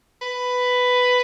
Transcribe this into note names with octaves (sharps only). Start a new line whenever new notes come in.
B4